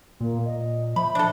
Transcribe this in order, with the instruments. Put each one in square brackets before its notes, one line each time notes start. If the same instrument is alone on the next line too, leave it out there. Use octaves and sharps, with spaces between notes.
[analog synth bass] A#2 [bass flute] A#3
[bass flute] D#5
[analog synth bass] F3 [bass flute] E5 [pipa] B5
[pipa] D4 A4